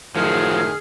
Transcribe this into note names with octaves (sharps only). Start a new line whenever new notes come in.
F#2 A2 D#3 F3 F#3 G#4 F6